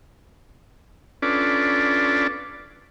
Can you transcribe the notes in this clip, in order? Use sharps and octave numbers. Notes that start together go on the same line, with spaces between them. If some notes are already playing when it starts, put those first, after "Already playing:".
C#4 D4 F4 A4 B4 D5